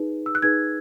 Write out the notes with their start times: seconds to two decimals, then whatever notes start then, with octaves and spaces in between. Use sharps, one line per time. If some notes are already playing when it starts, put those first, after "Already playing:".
Already playing: D#4 G#4 B4
0.26 E6
0.35 F#6
0.42 D#4 G#4 B4 G#6